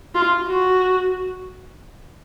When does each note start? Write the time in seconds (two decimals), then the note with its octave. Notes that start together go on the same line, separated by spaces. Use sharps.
0.15 F4
0.48 F#4